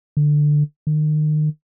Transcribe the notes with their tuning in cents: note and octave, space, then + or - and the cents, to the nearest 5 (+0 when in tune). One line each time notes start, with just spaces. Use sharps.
D3 +10
D#3 -35